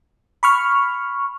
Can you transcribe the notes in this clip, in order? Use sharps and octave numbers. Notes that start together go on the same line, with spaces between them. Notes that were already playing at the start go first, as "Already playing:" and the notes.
B5 C#6 F6